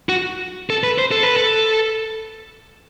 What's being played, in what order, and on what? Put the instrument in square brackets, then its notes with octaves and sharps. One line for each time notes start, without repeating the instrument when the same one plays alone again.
[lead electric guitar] F#4
A4
B4
C5
A4
B4
A4